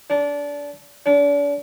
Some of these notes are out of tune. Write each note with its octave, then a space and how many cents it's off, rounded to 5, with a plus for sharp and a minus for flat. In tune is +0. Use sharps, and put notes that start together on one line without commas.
D4 -25
D4 -40